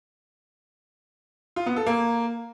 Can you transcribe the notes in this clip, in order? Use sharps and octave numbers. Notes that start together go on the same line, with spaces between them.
F4
B3
A4
A#3